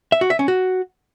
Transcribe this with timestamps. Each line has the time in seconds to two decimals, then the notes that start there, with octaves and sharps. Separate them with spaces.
0.12 E5
0.21 F#4
0.30 E5
0.39 C#4
0.48 F#4